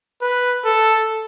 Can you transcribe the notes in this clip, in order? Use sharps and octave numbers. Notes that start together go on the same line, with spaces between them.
B4
A4